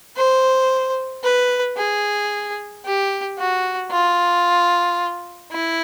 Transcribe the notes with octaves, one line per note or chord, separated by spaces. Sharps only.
C5
B4
G#4
G4
F#4
F4
E4